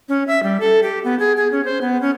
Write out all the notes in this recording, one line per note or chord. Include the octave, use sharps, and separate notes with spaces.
C#4
E5
G3
A4
G4
B3
G#4
G#4
C#4
C5
B3
C#4